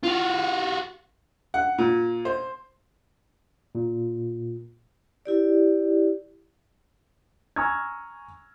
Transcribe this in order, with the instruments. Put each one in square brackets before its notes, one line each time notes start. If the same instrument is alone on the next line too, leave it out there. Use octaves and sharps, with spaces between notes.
[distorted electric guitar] F4 F#4
[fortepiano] F#5
A#2
C5
[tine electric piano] A#2
[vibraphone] E4 G4 D5
[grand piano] G#5 A#5 C#6 E6 F6 G#6